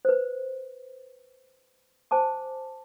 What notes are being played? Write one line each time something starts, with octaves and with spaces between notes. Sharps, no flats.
B4 C5
C5 G#5 A5 D6